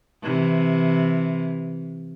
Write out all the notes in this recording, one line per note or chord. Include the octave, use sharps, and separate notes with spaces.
C3 E3